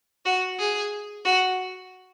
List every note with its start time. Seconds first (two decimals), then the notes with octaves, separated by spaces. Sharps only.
0.26 F#4
0.59 G#4
1.25 F#4